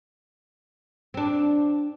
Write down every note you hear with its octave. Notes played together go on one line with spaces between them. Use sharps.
C4 D4